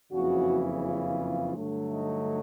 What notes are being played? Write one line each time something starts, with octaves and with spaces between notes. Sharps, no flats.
F#1 F2 C#3 E3 F#4
F4
G2 D3 F#3 A3
D#4